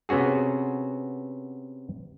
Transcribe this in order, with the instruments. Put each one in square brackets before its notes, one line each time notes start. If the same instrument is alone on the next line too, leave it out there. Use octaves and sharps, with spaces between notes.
[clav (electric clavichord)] C3 B3 C#4 F#4 G#4